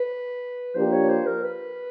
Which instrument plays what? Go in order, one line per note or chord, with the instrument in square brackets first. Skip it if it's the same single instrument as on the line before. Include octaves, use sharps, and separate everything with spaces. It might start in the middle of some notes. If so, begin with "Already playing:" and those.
Already playing: [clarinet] B4
[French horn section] F3 A#3 D4 G4 [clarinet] C5
[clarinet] C#5
C5
A#4
B4